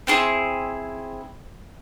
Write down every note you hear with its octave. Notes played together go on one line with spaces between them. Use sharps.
C4 E4 G#4